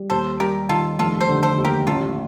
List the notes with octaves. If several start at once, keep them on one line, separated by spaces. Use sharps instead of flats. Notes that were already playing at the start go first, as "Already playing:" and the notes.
Already playing: G3
D#2 A4 C5
G3 G4 A#4
D#3 F4 A4
F1 F4 A4
A4 C5
D3
A4 C5
D#2
G4 A#4
A1 F4 A4